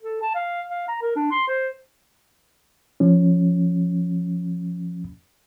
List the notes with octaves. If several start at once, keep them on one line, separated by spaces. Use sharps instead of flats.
A4
A5
F5
F5
A#5
A#4
D4
C6
C5
F3 C#4